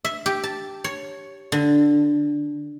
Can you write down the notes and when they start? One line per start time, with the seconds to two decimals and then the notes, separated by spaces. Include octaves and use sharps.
0.05 E5
0.26 G4
0.43 A5
0.84 C#5
1.52 D3